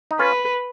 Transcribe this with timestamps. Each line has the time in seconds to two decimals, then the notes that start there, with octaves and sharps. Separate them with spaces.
0.11 D#4
0.19 C#4 F4 B4